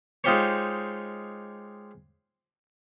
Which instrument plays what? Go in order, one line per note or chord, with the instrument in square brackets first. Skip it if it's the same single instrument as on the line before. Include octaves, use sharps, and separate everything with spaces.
[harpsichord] G#3 D#4 F4 G4 C5 C#5